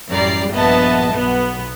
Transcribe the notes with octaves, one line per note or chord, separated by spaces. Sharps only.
A1 F#2 G3 D5 A#5 C7
A#1 G2 B3 D#5 E5 A5
B1 B3